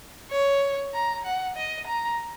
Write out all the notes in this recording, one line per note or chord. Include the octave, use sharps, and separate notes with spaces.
C#5
A#5
F#5
D#5
A#5